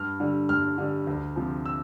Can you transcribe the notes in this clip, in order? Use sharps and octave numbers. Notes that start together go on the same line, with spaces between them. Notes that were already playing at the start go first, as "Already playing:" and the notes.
Already playing: G2 F6
D3 G3
G2 F6
D3 G3
D2
C3 F3
E6